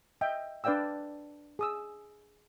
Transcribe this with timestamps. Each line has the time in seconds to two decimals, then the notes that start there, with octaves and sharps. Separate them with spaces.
0.21 D#5 E5 G5
0.64 D4 B4 D5 F5 G5 E6
1.59 G#4 D#6 E6